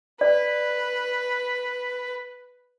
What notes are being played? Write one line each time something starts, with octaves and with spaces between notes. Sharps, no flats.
B4 D5